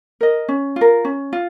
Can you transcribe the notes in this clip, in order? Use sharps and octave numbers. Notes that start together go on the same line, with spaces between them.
A#4 D#5
C#4
F4
A#4
C#4
F4